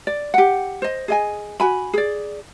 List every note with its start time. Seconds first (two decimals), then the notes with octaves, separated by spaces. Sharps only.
0.07 D5
0.34 G4 F#5
0.82 C5 D#5
1.08 G#4 D#5 G#5
1.60 F#4 G#5 B5
1.93 G#4 D5